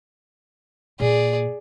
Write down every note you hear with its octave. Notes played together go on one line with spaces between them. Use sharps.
A#2 G#4 D5